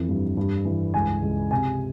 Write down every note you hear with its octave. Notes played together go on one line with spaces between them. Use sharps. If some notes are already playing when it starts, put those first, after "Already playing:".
Already playing: F2 E3
G2
G2
E3
C#2 G#5
C#2
C3 G#5